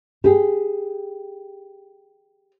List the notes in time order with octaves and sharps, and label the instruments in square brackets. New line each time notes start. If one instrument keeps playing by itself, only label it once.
[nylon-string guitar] G4 G#4